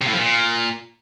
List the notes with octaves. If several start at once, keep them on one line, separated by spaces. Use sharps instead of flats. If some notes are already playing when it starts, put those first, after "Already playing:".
C3
A2
F3
A#2